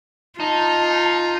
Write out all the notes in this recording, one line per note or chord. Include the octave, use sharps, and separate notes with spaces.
D#4 F4 A5